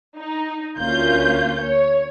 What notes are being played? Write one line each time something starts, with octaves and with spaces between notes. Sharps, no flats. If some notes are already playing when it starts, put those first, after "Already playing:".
D#4
D2 A#3 C#4 F4 G6
C#5